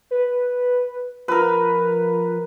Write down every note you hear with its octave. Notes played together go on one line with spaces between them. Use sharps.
B4
F3 A#4 B4